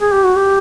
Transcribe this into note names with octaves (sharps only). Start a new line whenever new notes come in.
G#4
G4
F#4
G4